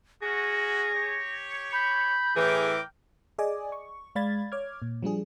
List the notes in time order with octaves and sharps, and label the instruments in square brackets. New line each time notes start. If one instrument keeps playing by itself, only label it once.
[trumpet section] C#4 F#4 [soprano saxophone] G#4 [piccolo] A#6
[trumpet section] G4 C#5
[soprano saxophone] B5 [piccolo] G6
[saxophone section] A2 E3 [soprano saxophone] G#4 [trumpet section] A#4 G5 D6
[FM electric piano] G#4 D5 D#5 G#5 D6 D#6
C#6
G#3 D5 F5 B5 G#6 A6
C#5 D6 F6 G#6
A#2
F3 G3 D4 G#4